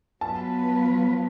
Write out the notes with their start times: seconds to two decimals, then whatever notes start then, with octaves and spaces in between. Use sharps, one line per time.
0.21 F#3 B3 F4 B4 A5